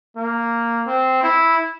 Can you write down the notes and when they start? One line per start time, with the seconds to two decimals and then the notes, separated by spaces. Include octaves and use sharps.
0.17 A#3
0.87 C4
1.23 E4